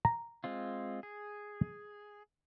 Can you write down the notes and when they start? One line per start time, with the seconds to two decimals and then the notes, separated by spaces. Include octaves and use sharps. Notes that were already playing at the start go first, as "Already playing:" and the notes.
0.05 A#5
0.44 G#3 C4 F4
1.03 G#4